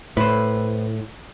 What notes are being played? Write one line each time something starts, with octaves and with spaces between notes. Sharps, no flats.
A2 B4 C5